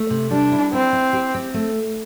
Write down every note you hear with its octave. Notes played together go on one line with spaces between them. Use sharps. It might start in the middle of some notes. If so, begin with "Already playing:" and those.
Already playing: A3
C3
G3 D4
E4
C4 E4
E4
G4
C4
A3